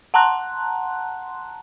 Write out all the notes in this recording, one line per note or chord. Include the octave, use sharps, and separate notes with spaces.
F#5 A5 A#5 C6 F#6